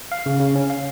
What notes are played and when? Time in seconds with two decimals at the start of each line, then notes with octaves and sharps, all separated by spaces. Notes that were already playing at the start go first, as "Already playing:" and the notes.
0.12 F5
0.26 C#3
0.40 C#3
0.56 C#4
0.70 F5